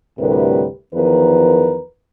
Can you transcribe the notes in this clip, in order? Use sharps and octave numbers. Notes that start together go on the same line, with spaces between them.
D2 A2 C3 G3 A#4 B4
E2 D#3 F3 A#4 B4